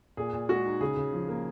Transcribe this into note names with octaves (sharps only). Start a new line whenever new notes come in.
A#2 G#4
A#2
G#3 F#4
D#4
C#3 G#4
C#3
F3
A#3